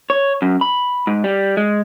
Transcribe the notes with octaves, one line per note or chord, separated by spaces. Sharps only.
C#5
F#2
B5
G#2
G3
G#3